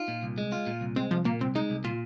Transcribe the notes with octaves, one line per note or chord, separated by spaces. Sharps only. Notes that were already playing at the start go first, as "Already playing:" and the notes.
Already playing: D#4 F4
A#2
C2
G#3
F4
A#2
C2
G#3 C4
C2 F3
A#2 A#3
C2 C4
G#3 D#4
C2
A#2 F4